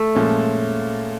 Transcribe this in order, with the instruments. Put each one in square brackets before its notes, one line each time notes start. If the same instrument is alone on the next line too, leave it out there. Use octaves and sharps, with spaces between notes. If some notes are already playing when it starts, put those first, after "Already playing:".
Already playing: [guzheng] A3
[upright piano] A#2 F3 G#3 C#4